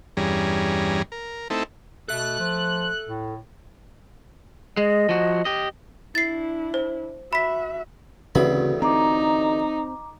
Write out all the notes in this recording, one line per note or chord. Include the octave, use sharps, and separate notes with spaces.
E2 G2 G3 C#4 G#4 A#5
A#4
A3 C4 D#4 E4 A4
B2 A4 E5 F#6
F3
A2
G#3 D#5
F3 F#4
G4 D#5
D4 E4 A6 C7
C5
F#4 E5 B5 B6
A1 D2 C#3 C4 F#4 G#4 B4 B5
C4 D#4 A#5 D6